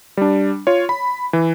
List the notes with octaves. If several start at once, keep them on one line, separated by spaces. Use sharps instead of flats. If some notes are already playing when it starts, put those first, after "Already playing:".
G3 D4
F4 C#5
B5
E3